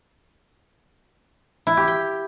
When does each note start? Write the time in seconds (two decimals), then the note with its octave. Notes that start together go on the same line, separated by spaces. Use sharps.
1.67 E4
1.77 G4
1.88 G5